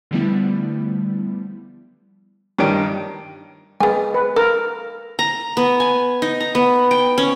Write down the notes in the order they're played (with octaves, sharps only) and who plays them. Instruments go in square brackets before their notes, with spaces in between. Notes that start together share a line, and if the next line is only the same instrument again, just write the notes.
[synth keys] D3 F3 G3 A3 B3 E4
[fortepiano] G2 D#3 [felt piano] G4 C#5 D7
[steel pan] G#3 [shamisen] B3 G#5
[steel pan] B4
[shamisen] A4 [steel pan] A#4
[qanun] A#5
B3
G#5
D#4
A#5
B3
G5
C#4